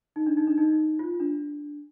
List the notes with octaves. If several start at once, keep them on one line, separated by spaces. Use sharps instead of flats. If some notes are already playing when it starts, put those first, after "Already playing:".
D#4
D4
D#4
D4
D#4
F4
D4